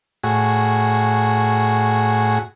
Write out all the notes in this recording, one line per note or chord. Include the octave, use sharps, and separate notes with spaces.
A2 F#4 G#4